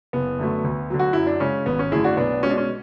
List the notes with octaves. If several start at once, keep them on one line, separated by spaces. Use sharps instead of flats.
F#1 B3
F#2 D3 F#3 A3
D2
D3 F#3
F#4
F#2 E4
D4
C#3 G#3 C#4
G#1 B3
C#4
F#2 D3 A3 E4 G#4
D4 F#4
B1 B3 D4
B2 G#3 C#4
D4
C#4